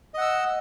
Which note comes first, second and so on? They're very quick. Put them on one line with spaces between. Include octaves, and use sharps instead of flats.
D#5 F#5 E6